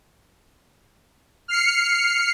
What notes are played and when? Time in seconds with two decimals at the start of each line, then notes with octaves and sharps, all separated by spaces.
1.48 F6 C7 C#7